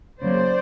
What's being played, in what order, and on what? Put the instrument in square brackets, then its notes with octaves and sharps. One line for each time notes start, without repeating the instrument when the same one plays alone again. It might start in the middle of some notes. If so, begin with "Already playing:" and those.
[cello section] C#3 F#3 A#3 C5 D5